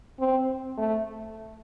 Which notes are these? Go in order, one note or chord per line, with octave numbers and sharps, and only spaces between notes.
C4
A3